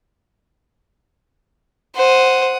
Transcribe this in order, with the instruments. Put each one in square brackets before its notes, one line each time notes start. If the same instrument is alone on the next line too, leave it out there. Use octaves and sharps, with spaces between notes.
[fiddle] C5 [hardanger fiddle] F#5 D#6